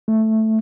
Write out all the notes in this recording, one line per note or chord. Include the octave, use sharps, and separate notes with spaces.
A3